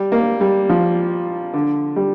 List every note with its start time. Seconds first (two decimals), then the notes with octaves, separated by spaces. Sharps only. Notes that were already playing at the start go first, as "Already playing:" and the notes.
Already playing: G3
0.12 A#3
0.41 G3
0.69 F3
1.53 D3
1.96 G3